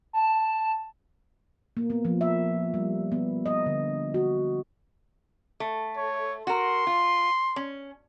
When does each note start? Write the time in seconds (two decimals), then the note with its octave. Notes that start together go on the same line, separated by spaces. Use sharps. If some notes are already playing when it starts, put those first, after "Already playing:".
0.13 A5
1.77 A#3
1.90 B3
2.05 F3
2.21 E5
2.74 G3
3.12 B3
3.46 D#5
3.66 D3
4.14 F#4
5.60 A3
5.97 C#5
6.47 F#4 A#4 C6
6.87 F4
7.56 C#4